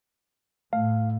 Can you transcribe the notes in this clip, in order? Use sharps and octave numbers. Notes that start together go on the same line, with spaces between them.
A2 A3 F5